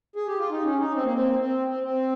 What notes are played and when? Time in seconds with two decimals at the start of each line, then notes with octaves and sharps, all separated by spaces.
0.16 G#4
0.27 G4
0.38 F4
0.50 D#4
0.65 C#4
0.79 D#4
0.95 C4
1.04 A#3
1.13 C4
1.39 C4
1.68 C4
1.83 C4